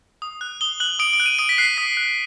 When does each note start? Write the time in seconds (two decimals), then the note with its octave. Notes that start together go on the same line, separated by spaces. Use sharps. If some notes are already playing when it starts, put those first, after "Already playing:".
0.22 D#6
0.41 F#6
0.61 D#6 G7
0.80 F#6 F#7
0.99 D#6 D7
1.13 D7
1.20 F#6
1.26 D#7
1.39 D#6 D7
1.49 B6
1.58 F#6 C7
1.77 D#6 B6
1.97 F#6